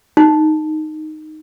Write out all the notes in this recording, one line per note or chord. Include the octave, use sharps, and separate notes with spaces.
D#4